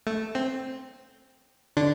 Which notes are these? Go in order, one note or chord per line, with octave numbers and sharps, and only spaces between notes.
A3
C4
D3 D4